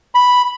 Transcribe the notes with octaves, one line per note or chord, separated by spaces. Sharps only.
B5